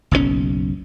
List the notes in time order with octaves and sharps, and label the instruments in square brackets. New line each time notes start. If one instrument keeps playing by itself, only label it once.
[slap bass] F#1 B1 A2 C#4